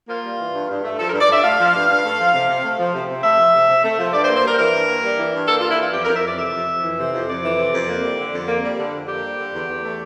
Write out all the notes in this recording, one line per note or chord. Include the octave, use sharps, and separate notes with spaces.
A#3 F4
G3
E3
G2
G2
A3
F3 A4
A#4
G2
D5
G2 E5
A3 F5
F3
G2
G2
A3
F3
C3
C3
A3
F3
C3
C3
A3 E5
F3
C3
C3
A3
F3
G2 D5
C5
A#3
C5
G3 A#4
E3 A#4
G2
A#3
G3
E3
G2
A#3 A4
F4
G3
E4
E3 F4
F2 G4
A#4
F2
E5
E3 D5
C3 E5
F2
F2
E3
C3
F2
F2 D5
E3
C3
F2
A#3
G3
D3
F2
A#3
G3
D3
F2
A#3 G4
G3
D3
E2
E2
A3